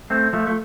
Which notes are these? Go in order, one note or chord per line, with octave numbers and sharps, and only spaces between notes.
A3 C4
F3 A3
A3